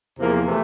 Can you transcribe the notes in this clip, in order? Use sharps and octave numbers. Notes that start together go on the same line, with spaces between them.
E2 C3 F3 A#3
C3 E3 A3